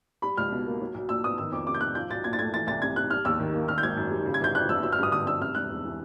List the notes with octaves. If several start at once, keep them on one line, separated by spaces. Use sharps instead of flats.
G3 B5
C#2 F6
B2
A#3
F#3
B1
A#2 E6
B3 D#6
D#3 E6
F2 D6
C3 D6
G6
G3 F#6
F3 G6
B1 A6
A#2 G#6
A6
A3 G#6
E3 A6
C2 A6
C3 G#6
G3 F#6
G3 F6
D#2 E6
D#3
A#3
D#3 F6
G6
G#1 G#6
F#2
G3
C#3
G#6
G1 G6
F2 F#6
G1 E6
F#3 E6
F6
G2 D#6
D3 D#6
G2 E6
C3 F6
E1 F#6
E2
E3